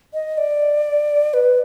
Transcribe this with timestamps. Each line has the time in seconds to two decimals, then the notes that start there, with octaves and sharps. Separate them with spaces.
0.14 D#5
0.38 D5
1.34 B4